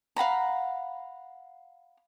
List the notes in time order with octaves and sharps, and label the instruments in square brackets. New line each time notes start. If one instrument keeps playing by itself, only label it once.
[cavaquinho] F5 F#5 A#5 B5